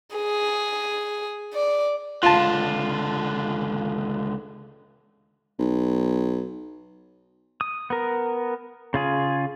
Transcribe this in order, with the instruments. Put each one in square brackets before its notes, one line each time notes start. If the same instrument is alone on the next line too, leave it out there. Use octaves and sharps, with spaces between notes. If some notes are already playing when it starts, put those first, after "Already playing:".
[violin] G#4
D5
[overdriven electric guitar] C#2 D3 [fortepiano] F4 A5
[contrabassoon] B1
[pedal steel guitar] D#6
B3 A#4
C#3 F4 G#4